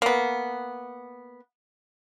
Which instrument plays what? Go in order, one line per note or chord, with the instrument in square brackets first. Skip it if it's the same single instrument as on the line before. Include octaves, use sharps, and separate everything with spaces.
[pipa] A#3 B3